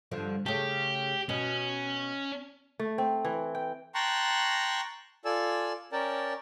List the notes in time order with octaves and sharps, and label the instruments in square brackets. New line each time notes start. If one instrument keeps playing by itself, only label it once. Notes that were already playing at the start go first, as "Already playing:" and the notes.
[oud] G2 D3 F3
[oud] C#3 A3 [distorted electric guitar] G4
[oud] B2 [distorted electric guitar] C#4
[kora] A3
C4
E3
G5
[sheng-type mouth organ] G5 A5 A#5 C6 C#6 F#6
F4 A4 D5 G#5 E6
C#4 A#4 D5 G5 A5